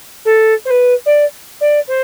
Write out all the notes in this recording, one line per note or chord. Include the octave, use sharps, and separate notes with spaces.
A4
C5
B4
D5
D5
C5